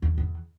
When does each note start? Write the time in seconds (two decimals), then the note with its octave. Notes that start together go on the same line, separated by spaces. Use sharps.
0.02 E2
0.18 E2